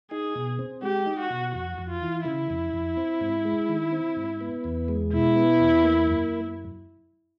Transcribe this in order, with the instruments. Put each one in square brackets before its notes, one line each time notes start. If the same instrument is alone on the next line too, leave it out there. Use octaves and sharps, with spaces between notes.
[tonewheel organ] D#4 [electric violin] G#4
[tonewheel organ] B2
C4
[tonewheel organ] G#3 [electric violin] G4
[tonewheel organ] D#4
[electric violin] F#4
[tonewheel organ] B2
[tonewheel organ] F2 [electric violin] F#4
[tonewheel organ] F2
[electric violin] F4
[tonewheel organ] E3
[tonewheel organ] C#3 [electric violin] E4
[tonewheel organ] F2
F2
C4
G#2
G#3
D#3
C4
G#2
B3
E2
G#3
[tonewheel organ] B2 [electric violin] E4
[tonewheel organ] B3
E2
A#3
F#2